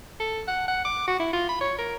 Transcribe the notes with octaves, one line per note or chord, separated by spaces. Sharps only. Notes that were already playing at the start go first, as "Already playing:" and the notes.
A4
F#5
F#5
D6
F#4
E4
F4
B5
C#5
A#4